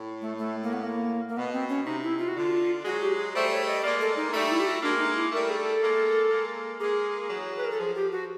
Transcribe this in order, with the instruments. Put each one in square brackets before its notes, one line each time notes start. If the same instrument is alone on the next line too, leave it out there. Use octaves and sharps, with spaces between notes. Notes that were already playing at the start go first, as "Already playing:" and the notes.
Already playing: [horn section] A2
[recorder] A3
A3
A#3
B3
A#3
A#3
[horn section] B2 [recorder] B3
[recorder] C4
C#4
[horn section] C3 [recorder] D#4
[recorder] E4
F4
F#4
[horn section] D3 [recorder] F4
[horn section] F#3 G#3 [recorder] F#4
[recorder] G4
G#4
[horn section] G3 A3 [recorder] C5
[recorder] C#5
D#5
[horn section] G#3 A#3 [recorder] D5
[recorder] A4
D#4
[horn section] G3 A3 [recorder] D#4
[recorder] E4
G4
F#4
[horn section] G#3 A#3 [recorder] D4
[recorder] D#4
E4
[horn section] G3 A3 [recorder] A#4
[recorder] G#4
A4
[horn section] G#3 A#3
G#3 A#3
[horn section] G#3 A#3 [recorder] G#4
[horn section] E3 F#3
[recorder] B4
A#4
A4
[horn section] F3 [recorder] G#4
[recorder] G4
F#4